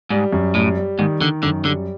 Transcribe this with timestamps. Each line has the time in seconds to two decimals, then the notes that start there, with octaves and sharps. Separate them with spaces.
0.10 G#2 G3
0.33 F#2
0.55 A2 G3
0.77 G3
0.99 G#2 D#3
1.20 D3 D#3
1.43 F#2 D3
1.65 D3 G3